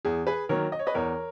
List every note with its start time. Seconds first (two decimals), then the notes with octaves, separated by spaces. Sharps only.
0.05 E2 G#4
0.27 G#4 B4
0.49 D#3 F#3 A#3 A#4 C#5
0.72 D#5
0.79 C#5
0.87 B4 D#5
0.94 E2 A#4 C#5